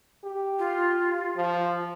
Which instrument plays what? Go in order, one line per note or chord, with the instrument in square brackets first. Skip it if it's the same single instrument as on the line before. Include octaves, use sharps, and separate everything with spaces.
[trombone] G4
[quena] F4
[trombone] F3